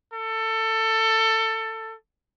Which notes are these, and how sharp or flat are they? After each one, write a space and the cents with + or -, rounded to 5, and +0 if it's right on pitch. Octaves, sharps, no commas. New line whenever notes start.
A4 +20